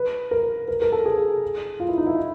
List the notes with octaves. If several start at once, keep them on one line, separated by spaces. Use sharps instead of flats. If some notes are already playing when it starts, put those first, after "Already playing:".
Already playing: B4
A#4
A#4
A#4
A4
G#4
F4
E4
D#4
E4